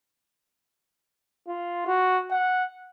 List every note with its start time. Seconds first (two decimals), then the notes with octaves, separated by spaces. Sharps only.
1.48 F4
1.87 F#4
2.31 F#5